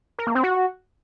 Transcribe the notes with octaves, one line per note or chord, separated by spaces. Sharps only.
A#4
A#3
C4
F#4